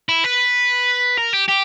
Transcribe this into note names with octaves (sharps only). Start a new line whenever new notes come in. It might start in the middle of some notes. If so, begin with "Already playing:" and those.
E4
B4
A#4
G4
G4